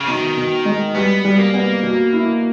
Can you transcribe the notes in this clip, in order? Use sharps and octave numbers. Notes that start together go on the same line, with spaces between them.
C#3
B2 D#3
B2
G#3
G3 B3
G3
A#3
B3
B2
E4